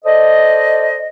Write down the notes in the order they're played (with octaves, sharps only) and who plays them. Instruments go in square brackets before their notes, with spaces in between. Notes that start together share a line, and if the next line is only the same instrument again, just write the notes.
[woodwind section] A4 C5 D5 D#5